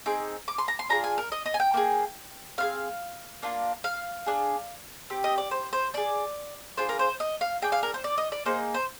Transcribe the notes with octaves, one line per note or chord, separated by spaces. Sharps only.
C4 D#4 G#4 D6
D6
C6
A#5
C6
D4 F4 G#4 A#5
G#5
A#4
D#5
D#5
G#5
G5
A#3 F4 G#4
C4 F4 G#4 F5
A#3 D4 F4
F5
D4 G#4
C4 G4
D#5
D5
C5
C5
D4 G#4 D5
D4 F4 G#4 C5
A#4
C5
D#5
F5
D4 G#4 G5
F5
A#4
C5
D5
D#5
D5
A#3 D#4 G#4 C5
C5